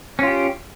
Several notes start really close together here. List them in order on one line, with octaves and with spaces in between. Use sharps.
C#4 F4 G4